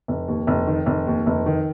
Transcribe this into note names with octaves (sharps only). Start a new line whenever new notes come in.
F1
D#2
F1
D#3
F1
D#2
F1
D#3